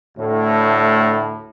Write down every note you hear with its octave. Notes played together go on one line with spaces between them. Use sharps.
D2 A2